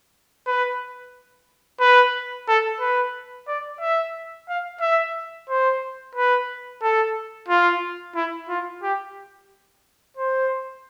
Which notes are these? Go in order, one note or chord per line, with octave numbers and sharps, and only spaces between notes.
B4
B4
A4
B4
D5
E5
F5
E5
C5
B4
A4
F4
E4
F4
G4
C5